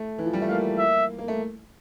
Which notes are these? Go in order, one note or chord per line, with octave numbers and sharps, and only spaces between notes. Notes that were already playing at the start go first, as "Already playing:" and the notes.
Already playing: A3
E3
F3
G3
A3
A#3 F5
E5
A#3
A3